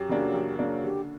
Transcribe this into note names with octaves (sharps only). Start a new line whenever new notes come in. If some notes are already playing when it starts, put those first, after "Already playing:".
Already playing: F#2 G4
C#3 F#3 A#3 D4
F#2
C#3 F#3 A#3 D4
D3 G4